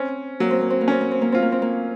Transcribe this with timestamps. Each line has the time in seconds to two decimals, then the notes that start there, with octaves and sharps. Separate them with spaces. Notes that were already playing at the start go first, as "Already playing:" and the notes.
Already playing: C4 C#4
0.40 F#3 A#3
0.51 C4
0.61 A#3
0.70 C4
0.81 A#3
0.88 C4 C#4
1.01 A#3
1.11 C4
1.21 A#3
1.32 C4 F4
1.42 A#3
1.52 C4
1.62 A#3